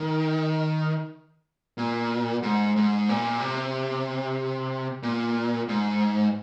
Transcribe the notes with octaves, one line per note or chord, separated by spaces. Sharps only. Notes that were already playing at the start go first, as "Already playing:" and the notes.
Already playing: D#3
A#2
G#2
G#2
A#2
C3
A#2
G#2